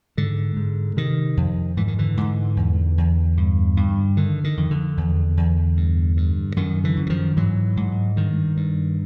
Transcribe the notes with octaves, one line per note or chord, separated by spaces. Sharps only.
G#2 D3
G#2
C3 D#3
F2
G#2 E3
D#3
D3 E3
G#2
E2
E2
G2
G2
D3 D#3
D#3
F2
D3
E2
E2
G2
G2
F#2 D#3
D3 E3
F#2
E3
D#3 F3
G#2 E3 F#3
G#2
G2 D#3
G2